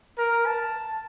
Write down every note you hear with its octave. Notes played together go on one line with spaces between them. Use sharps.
A#4
A5